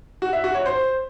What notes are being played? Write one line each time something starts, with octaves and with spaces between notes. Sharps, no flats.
F#4
E5
F#4
C#5
C5